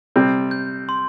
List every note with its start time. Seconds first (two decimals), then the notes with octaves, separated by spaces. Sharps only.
0.16 C3 G3 C4
0.51 G6
0.89 C6